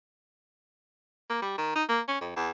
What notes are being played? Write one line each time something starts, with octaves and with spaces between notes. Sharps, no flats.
A#3
G3
D#3
D#4
A#3
C#4
F2
E2